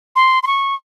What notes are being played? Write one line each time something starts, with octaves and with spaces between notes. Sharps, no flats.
C6
C6
C#6